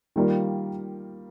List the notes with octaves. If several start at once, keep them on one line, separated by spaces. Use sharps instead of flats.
D#3 G3 A#3 F4 A#4